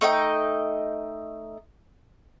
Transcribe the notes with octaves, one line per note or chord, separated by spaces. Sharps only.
A3 D#4 D#5 G5